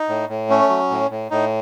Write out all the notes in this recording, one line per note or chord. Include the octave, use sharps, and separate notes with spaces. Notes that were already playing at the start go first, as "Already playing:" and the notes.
Already playing: D#4
A2
A2
A3 C#4
F#3
A2
A2
A2 D#4